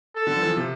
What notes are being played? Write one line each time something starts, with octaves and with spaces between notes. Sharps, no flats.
A4
D3
F3
E3
F3
C3